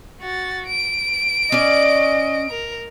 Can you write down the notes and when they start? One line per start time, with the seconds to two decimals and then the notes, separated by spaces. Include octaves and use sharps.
0.21 F#4 A6
0.67 D7
1.52 C#4 D5 D#5
2.50 A#4